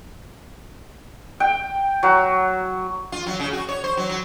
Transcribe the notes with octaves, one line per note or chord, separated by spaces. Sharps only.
G5
F#3
F4
F#3
C#3
F#4
C#5
C5
F#3
F#3